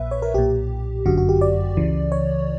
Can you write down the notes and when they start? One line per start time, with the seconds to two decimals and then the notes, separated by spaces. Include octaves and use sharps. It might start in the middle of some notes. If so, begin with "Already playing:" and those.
Already playing: A#1 A#2 B4 E5
0.11 C#5
0.22 A#4
0.34 B1 A#2 G4
1.05 G1 F#2 D3 F#4
1.18 F#4
1.29 G4
1.41 D5
1.77 C#2 C#3 E3
2.12 C#5